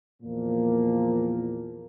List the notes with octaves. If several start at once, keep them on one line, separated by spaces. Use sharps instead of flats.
E2 A#2 F3 A#3